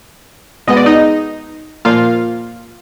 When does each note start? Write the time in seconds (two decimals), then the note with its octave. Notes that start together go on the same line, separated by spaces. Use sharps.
0.67 B2 G#3 B3 D#5
0.77 D5
0.86 D#4 D#5
1.85 A#2 F3 A#3 F4 F5